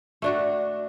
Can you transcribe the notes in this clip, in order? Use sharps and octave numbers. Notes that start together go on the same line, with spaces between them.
A3 D4 F#4